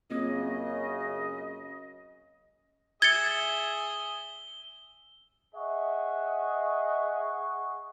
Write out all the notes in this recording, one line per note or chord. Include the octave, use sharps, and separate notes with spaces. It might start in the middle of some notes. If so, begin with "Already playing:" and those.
F#2 C#3 A#3 C4 F4 D#5
G#4 E5 G#6 A6 C#7 G7
G#4 D#5 E5 F#5 C#6